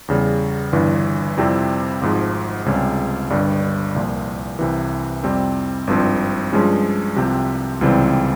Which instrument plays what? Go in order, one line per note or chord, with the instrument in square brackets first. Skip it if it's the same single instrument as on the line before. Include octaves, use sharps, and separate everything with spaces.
[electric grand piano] E2 C#3 G3
G1 G2 E3
F2 C3 G3 C4 E4
G#1 G#2 F3
C#2 C3 G3 C#4
G1 G2 G3
C2 A#2 F3
C2 C3 E3
F2 C3 G3 C4
G#1 G2 F3 C4
G2 F3 G#3 C#4 G4
C2 C3 F3 C4 G4
C#2 C3 E3 G3 C4